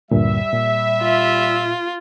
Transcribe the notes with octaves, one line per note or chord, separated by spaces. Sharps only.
D2 G2 A#2 G3 E5
A#2
F4